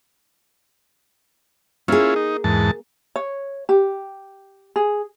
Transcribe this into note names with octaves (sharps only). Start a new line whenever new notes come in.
A#3 C#4 E4 F4 G#4
D#4
E2 G#2 A5
C#5
G4
G#4